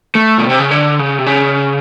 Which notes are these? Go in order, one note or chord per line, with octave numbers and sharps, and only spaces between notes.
A3
B2
C3
C#3
D3
C#3
C3
C#3